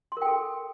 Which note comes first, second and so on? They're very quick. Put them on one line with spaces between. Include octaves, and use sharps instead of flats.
C6 A#4 G5 A4